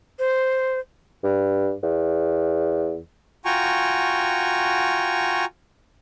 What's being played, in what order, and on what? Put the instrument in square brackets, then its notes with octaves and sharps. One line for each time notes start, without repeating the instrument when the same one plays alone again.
[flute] C5
[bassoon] G2
E2
[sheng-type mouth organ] F4 F#4 G5 G#5 A#5 C#6